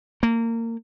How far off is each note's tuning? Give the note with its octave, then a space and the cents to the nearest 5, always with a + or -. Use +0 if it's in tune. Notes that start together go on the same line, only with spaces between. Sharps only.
A#3 -25